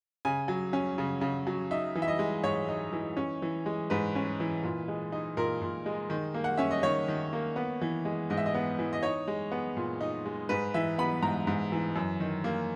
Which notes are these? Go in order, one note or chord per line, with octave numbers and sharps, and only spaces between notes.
C#3 G#5
F#3
C#4
C#3
C#3
F#3
D#4 E5
E3
E5
D#5
G#3
G#2 C#5
D#4
E3
C#4
E3
G#3
G#2 B4
C#4
E3
A#2
G#3
D#4
A#2 A#4
A#2
G#3
D#3
A#3
F#5
C#4 E5
D#5
D#3 C#5
D#3
A#3
B3
E3
G#3
G#2 D#5
E5
D#5
B3
E3
D#5
D#4 C#5
G#3
B3
A#2
D#4
G#3
G#2 B4
E3 E5
B3 B5
G#2 A#5
G#2
E3
F#2
D#3
A#3